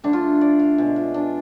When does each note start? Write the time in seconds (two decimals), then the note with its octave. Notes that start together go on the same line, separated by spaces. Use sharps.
0.04 D3 A3 D4
0.13 F4
0.41 D5
0.59 F5
0.78 B2 G#3 E5
0.96 F4
1.14 D4